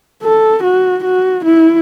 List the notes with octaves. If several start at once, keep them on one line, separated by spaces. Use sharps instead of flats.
A4
F#4
F#4
E4